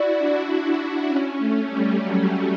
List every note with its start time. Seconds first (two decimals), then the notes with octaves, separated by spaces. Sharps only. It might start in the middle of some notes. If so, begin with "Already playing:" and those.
Already playing: E4 F#4 D5
0.18 D4
0.63 D4
1.08 C#4
1.39 A3
1.68 G3
1.99 F#3